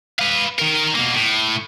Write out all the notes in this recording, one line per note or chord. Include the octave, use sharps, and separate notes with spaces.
B4 F5
D#3 A#4
B2 A#3
A2